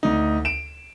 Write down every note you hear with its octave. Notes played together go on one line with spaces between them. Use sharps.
D2 D#4
D7 E7